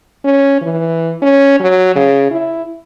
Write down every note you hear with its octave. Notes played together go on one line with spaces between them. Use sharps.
C#4
E3
C#4
F#3
C#3
E4